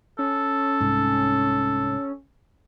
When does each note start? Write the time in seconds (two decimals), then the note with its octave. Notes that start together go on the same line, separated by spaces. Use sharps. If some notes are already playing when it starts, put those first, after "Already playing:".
0.19 C#4 A4
0.81 C2 G#2